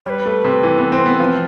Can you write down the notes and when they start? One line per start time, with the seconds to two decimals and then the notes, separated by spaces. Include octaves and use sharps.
0.06 G3 B4 C#5
0.26 A3
0.44 C3
0.63 E3
0.78 B3
0.92 C4
1.06 B3
1.20 F3